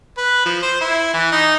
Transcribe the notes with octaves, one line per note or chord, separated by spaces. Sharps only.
B4
F3
C5
E4
E3
D#4